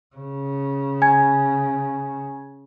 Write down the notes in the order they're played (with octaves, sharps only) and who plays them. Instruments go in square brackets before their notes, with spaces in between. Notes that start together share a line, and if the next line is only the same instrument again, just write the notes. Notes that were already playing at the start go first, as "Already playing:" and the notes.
[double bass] C#3
[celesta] G#5 G#6